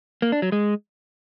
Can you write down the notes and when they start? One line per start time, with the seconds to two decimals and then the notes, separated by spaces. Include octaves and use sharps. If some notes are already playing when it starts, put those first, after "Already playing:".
0.22 A#3
0.32 D4
0.42 F#3
0.52 G#3